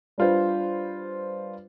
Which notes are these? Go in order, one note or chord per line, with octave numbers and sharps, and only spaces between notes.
G3 D4 F4 B4 C5